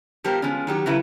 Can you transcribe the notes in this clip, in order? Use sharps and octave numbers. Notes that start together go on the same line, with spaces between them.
F3 G3 B3 G4 A#4 C5
F3 G#3 B3 C#4
D#3 F#3 G4
C#3 F#3 A3 E4 B4